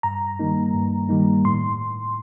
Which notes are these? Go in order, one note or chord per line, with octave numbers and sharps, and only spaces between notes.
G2 A#5
D#3 G3 A#3 D#4
G2
D#3 G3 A#3 D#4
A2 C6